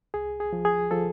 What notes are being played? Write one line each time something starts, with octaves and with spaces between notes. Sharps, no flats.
C2 G#4
G#4
F3
G#4
F3 A4